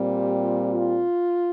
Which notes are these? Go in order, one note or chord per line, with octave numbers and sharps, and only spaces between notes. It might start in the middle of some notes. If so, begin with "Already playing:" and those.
Already playing: A#2 G3 C4
G4
F4
F4